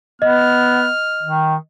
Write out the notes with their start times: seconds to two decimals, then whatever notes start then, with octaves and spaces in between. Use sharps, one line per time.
0.22 B3 D#5 F6
1.22 D#3